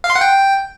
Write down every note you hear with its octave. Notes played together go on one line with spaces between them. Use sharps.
F5
C6
F#5
G5